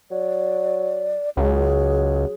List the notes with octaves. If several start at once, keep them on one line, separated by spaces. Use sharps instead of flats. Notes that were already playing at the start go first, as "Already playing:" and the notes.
F#3 D5
C#2 F#3 G#4